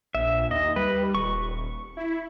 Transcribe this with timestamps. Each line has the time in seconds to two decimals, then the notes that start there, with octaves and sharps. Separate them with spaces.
0.15 A#1 E5
0.51 D#2 D#5
0.76 G3 B4
1.15 D#1 C#6
1.97 E4